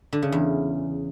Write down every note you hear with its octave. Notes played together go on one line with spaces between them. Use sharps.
D3
C#3
E2